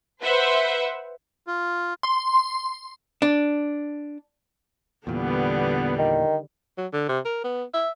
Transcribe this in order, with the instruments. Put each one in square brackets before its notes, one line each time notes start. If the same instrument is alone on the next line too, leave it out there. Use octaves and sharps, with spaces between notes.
[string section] B4 C5 E5 F#5
[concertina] F4
[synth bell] C6
[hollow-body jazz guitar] D4
[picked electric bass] E2 A#2 [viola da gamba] D3 G3 [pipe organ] B3
[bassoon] D#3
[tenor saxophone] F#3
D3
C3
A#4
B3
E5